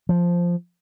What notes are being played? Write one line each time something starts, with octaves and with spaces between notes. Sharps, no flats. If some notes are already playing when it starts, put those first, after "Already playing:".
F3